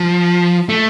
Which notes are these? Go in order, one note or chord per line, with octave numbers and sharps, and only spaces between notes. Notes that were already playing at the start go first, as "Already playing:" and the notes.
Already playing: F3
A3